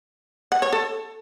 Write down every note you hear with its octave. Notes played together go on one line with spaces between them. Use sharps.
F#5
C#5
A4